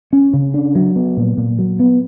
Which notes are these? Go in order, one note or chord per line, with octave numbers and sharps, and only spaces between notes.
C#4
C#3
D4
F#3
B3
A#2
A#2
F#3
B3